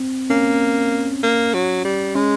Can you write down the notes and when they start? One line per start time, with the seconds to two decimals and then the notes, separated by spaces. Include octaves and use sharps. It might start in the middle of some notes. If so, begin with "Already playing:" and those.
Already playing: C4
0.30 A#3 C#4
1.23 A#3
1.54 F#3
1.85 G3
2.15 G#3 C#4